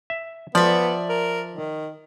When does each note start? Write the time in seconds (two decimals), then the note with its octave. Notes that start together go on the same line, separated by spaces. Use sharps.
0.10 E5
0.55 F3 B3 D5 E5
1.09 A#4
1.54 D#3